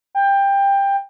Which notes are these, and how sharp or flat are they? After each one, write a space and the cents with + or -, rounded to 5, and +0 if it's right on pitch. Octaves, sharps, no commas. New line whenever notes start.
G5 +20